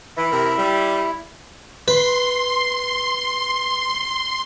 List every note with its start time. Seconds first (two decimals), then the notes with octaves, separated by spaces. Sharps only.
0.17 E3 E4 E5
0.32 C3 A#4
0.58 G3
1.88 B4 C6